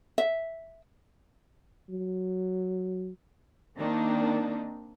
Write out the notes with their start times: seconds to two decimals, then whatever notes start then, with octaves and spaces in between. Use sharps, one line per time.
0.18 E5
1.90 F#3
3.77 D#3 A#3 C4 D4 D#4